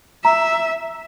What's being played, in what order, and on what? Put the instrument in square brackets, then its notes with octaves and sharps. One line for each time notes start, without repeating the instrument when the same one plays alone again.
[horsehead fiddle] E5 [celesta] A#5